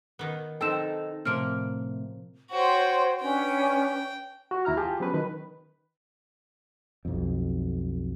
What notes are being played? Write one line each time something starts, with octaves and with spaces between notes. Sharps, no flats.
D#3 B3
C4 D#4 A4 G5 E6 E7
A2 C3 F3 A#3 F6 D7
F#4 C5 C#5 G5 C6
C#4 D4 B4 G5
F#4
D#2 E4 A#5 F6
F4 G4 G#4 A5
F#3 B3 C#4 B4
D#3 B4
B1 F2